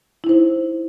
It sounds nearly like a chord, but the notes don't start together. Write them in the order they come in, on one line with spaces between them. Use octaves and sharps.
E4 D#4 C5